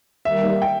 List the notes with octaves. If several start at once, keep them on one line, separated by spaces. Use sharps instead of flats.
D#3 G3 A#3 E5
G5